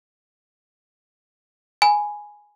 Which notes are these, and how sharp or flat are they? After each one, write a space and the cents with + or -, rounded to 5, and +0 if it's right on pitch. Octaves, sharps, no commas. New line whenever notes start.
G#5 +0 B5 +0